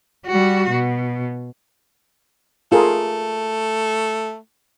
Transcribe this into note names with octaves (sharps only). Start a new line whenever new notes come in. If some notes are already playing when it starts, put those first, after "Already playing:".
G3 F#4
B2
A3 F4 G#4 A#4